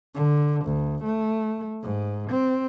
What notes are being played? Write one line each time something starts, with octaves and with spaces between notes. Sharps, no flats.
D3
D2
A3
G#2
C4